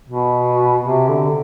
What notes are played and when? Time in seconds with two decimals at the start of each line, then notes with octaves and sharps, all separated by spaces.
0.09 B2
0.83 C3
1.08 D3